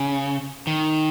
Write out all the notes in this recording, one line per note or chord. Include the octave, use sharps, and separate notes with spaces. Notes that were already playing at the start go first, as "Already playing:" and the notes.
Already playing: C#3
D#3